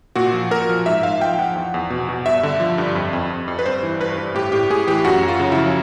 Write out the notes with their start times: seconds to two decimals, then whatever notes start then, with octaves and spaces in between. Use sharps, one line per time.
0.16 A#2 F#4
0.33 F3
0.51 A#2 A#4
0.69 F3
0.86 G#2 E5
1.03 G#2 F5
1.20 F3 G5
1.39 F3 F#5
1.55 E2
1.74 E2
1.90 B2
2.09 B2
2.25 G2 E5
2.43 D3
2.60 F3
2.78 G2
2.95 F2
3.13 F2
3.30 F2
3.48 F2
3.59 B4
3.66 G2 C5
3.83 E3
4.00 G2 B4
4.18 G2
4.35 A2 G4
4.52 A2 G4
4.70 A2 G#4
4.87 E3 G4
5.04 F#2 F#4
5.23 F#2
5.28 F4
5.40 C#3
5.52 F3 E4